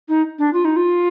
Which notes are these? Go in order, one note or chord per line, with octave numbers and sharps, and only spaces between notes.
D#4
D4
F4
D#4
F4